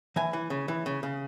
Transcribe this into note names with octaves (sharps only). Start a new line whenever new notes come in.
E3 G#5
E3
C#3
E3
C#3
C#3